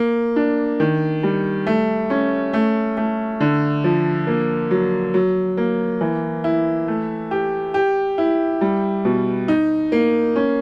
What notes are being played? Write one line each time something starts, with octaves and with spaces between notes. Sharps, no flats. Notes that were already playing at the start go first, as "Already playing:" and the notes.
Already playing: A#3
D4
D#3
G3
A3
C#4
A3
A3
D3
F3
A#3
F#3
F#3
A#3
E3
E4
A3
G4
G4
E4
G3
B2
D#4
A#3
C#4